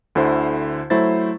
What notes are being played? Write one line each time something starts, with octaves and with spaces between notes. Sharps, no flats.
D2 D3 E4 C5
F#3 A3 E4 C5 A6